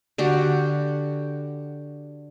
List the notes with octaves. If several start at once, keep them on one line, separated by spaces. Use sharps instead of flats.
D3 F#4 G4